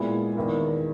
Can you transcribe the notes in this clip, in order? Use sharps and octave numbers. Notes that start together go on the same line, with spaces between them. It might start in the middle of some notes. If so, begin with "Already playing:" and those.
Already playing: A#2 G#3 B3 E4 G#4
E2 D#3 A#3 E4 A#4